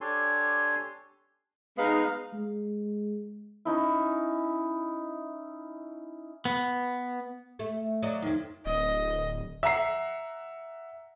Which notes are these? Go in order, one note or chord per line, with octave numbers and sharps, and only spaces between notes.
D4 G4 A4 C#5 G#5 C6
G#3 B3 D#4 F5
G#3
C#4 D#4 E4
B3
A3
F#3 D5 D#5
F2 D#3
D1 D#5
E5 F#5 A#5 C7